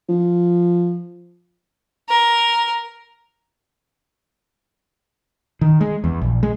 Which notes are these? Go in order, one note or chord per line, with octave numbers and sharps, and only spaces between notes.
F3
A#4
D#3
G#3
E2
A#1
G#3